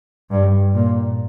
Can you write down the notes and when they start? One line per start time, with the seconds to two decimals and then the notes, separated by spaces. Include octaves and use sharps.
0.31 G2
0.74 A#2